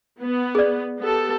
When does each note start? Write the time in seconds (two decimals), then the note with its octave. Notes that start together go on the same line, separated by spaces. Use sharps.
0.21 B3
0.55 G#4 D5
0.99 B3 G4 A4